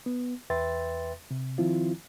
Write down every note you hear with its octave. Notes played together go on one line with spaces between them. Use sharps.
B3
E2 B4 E5 G5 C6 A6
C3
D#3 F3 C4 E4 F4